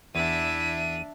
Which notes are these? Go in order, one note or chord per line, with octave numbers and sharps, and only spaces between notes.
E2 D4 E4 E5 D#7